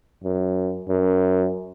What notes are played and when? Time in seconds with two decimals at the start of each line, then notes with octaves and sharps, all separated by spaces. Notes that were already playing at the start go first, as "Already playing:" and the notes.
0.24 F#2
0.88 F#2